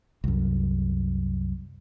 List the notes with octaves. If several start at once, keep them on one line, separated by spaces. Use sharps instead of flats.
C2 F#2